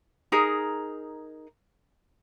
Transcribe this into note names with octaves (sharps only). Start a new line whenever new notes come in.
D#4 G#4 A#4